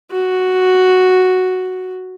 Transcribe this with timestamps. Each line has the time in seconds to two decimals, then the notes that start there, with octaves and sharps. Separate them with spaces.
0.12 F#4